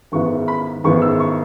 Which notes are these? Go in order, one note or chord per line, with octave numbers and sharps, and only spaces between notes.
G#1 G#2 G#3 B3 E4 C#6
B5
G#1 G#2 G#3 B3 E4 C#6
E6
C#6